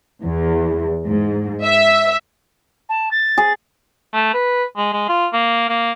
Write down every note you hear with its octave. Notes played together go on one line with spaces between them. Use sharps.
E2
G#2
E5
A5
A6
G#4
A3
B4
G#3
G#3
F4
A#3
A#3